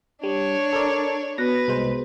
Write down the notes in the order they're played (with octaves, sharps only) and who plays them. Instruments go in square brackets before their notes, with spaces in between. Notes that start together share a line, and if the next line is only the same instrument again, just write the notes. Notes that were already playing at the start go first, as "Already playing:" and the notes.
[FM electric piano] G3 [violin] D4 C#5
[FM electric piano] A4 A#4 D5
[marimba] B3 F#4 F#6 [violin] B4 [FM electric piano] A#6
[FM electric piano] C2 G#3 C5